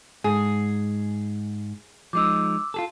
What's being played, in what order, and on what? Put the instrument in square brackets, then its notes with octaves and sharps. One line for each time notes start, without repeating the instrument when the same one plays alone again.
[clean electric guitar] G#2 [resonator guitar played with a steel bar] G#4
[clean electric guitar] F3 G#3 D#4 [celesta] D6 E6
[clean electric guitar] F4 G#4 A4